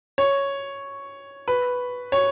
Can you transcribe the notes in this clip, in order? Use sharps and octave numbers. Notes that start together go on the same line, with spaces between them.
C#5
B4
C#5